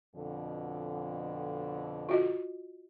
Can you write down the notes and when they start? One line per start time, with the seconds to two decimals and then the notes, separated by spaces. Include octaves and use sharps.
0.15 F2 B2 D3
2.09 F4 F#4 D#5